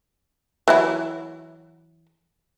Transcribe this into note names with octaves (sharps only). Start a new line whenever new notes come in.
E3 F#3 E4